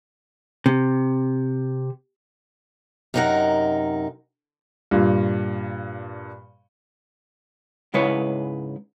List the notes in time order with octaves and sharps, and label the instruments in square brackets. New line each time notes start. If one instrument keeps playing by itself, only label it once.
[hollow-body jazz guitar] C3
[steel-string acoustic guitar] F#2 C3 D#4 F#4 A#4 F#5
[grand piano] G2 A#2
[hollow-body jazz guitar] G#2 C#3 G#3 E4 B4 C#5